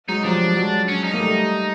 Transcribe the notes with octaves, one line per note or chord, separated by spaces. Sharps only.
F#3 G#3 D#4
F3 G3 D4
F#3 G#3
C#4
D#4
A#3
G3 A3